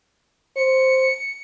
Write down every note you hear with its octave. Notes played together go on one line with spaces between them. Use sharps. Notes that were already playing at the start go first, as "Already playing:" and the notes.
C5 C#7